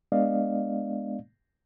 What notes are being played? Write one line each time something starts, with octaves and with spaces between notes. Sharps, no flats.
G#3 B3 D4 D5 D#5 F5